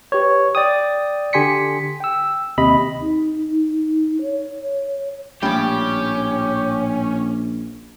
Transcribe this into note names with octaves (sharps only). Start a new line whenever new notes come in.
G4 B4 C#5
D5 G5 D#6
D3 G4 G#5 C6 B6 C#7
G5 E6
D#2 C3 D#5 B5
D#4
C#5
A#1 A2 G3 C#4 G4